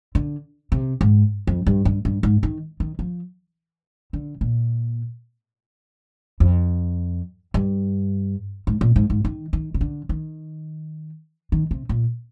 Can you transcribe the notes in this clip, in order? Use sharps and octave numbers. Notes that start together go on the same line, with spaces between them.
D3
C3
G#2
F2
G2
G2
G2
G#2
D#3
D#3
F3
D3
A#2
F2
G2
G#2
A#2
G#2
G#2
D#3
D#3
C3
D3
D#3
D#3
C3
A#2